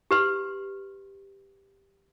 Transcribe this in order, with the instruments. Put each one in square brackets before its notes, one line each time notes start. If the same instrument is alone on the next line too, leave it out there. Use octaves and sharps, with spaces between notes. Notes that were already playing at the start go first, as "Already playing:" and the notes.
[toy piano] G4 B4 C6